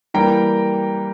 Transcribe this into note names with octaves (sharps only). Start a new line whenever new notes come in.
E3 G3 A#3 G5 A#5